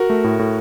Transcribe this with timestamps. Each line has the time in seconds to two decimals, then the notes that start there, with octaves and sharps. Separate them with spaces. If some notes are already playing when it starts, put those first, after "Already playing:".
Already playing: F#4 A#4
0.10 A3
0.24 A2
0.39 A2